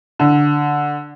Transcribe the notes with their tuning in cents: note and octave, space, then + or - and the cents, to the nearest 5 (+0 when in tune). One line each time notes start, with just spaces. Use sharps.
D3 +0